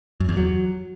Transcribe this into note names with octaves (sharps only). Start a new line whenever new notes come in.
F#2
E2
F#3